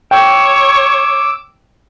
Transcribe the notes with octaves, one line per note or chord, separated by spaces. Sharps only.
C#5 G5 D6 E6